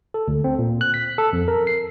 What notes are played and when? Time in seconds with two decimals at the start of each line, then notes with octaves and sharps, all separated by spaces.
0.14 A4
0.28 D2
0.44 C4
0.59 A#2
0.81 F#6
0.94 B6
1.18 A4
1.33 F2
1.48 A#4
1.67 C7